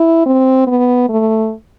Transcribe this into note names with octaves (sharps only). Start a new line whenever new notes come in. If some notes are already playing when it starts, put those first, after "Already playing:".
Already playing: E4
C4
B3
A3